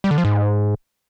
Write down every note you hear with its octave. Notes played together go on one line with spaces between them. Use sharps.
G3
D3
F3
G#2